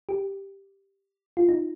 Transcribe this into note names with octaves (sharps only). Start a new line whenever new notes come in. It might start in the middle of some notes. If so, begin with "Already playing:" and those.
G4
F4
D#4